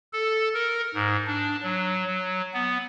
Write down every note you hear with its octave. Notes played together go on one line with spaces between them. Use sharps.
A4
A#4
G#2
D4
F#3
F#3
B3